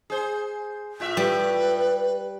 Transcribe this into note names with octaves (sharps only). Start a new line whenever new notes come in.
G#4 C5
A2 F4 E5
G3 B4